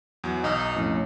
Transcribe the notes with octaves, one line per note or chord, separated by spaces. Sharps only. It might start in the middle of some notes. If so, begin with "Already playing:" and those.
E2 F#3
B1 D#4 E6 F6
F2 A2 C#4